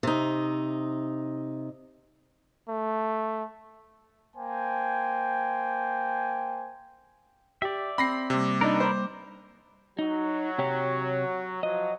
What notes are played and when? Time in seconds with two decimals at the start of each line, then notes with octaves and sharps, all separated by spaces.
0.03 C3 D#4
2.69 A3
4.36 A#3 C5 G5 G#5
7.62 G4 D5 E5
7.98 C4 B5 A#6 C7
8.30 C3 G3 A#3 D6
8.61 D4 D#4 A#4 B4
8.80 C5
9.99 F#3 D#4
10.58 C3 G4 C#5
11.63 F3 F#3 D#5